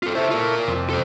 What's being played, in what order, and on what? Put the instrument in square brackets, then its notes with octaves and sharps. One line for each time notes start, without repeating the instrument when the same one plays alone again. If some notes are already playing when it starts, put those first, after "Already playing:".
[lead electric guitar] F4 A4
[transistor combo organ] E4 A4 C#5 [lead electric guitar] C5 E5
[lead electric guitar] F4 A#4
[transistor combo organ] F2 C3
[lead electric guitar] A4 C5